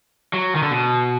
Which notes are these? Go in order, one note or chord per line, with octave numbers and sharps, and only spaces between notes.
F#3
D#3
D3
B2